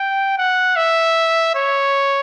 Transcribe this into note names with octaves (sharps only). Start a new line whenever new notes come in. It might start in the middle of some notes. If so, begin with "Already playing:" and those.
Already playing: G5
F#5
E5
C#5